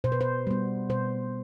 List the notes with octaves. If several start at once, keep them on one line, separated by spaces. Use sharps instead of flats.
B2 C5
B4
C5
G3 B3
B2 C5